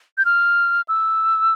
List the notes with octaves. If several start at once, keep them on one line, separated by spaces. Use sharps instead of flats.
G6
F6
E6